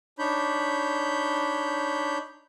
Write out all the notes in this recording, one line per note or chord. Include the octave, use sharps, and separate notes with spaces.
D4 D#4 C#5 B5 G6